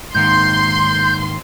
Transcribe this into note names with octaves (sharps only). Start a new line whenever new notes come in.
G#2 D#3 A#3 C6 G6